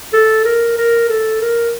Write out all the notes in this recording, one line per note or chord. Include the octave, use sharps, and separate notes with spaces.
A4
A#4
A#4
A4
A#4